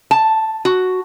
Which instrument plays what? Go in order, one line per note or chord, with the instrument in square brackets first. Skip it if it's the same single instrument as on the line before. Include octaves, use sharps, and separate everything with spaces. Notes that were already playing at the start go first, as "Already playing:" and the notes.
[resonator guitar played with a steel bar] A5
F#4